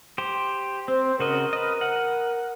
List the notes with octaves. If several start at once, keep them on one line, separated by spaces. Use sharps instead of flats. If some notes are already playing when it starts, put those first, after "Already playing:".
G4 C5
C4 C5
C#3 F#4 A#4 D#5
B4 D#5
F#5